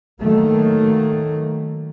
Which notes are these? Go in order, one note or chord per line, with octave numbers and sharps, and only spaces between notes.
D#3 F#3 A3 A#3